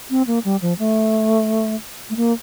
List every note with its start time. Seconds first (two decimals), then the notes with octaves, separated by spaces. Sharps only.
0.10 C4
0.27 A#3
0.45 G3
0.62 F3
0.79 A3
2.10 A3
2.17 A#3